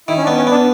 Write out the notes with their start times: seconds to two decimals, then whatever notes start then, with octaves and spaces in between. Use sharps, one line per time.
0.08 D#3 E4
0.17 C#4
0.23 D4
0.27 B3
0.37 C#4
0.47 B3 D4